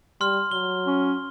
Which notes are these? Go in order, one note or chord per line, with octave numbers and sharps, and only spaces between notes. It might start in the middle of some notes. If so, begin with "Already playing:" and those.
G3 C6 F6
F#3 G7
C#4